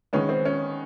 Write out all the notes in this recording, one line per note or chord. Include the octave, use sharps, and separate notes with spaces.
D#3 G#3 B3 C#4
C4
C#4